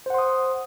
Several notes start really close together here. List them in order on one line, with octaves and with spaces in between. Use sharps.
C5 F#5 C6 D#6